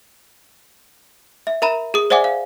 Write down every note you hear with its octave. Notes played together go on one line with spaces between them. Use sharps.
E5
A#4 E5 A#5 B5 E7
G#4 D#6
C5 D5 E5 F#5 G#5 D6
F5